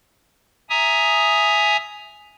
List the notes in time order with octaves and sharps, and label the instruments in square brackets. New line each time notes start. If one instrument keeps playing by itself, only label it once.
[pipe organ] E5 G#5 A#5 D#6